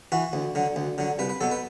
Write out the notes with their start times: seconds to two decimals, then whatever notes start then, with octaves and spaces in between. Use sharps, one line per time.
0.12 E3 F#4
0.33 D2
0.55 D3 F#3
0.76 D2
0.98 D3 F#3
1.19 C2 B4
1.29 B4
1.41 B2 F#3 A4
1.51 B4